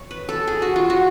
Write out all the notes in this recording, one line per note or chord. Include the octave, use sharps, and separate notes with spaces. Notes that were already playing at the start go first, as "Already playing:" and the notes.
Already playing: C#5
B4
A4
G#4
F#4
F4
F#4